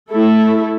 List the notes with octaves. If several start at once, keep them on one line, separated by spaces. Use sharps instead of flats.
A3 E4 A4